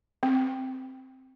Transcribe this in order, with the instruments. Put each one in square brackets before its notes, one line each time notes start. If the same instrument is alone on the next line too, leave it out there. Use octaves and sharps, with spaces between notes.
[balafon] C4